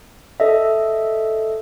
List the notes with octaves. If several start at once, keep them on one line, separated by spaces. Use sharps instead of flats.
A4 D#5 E5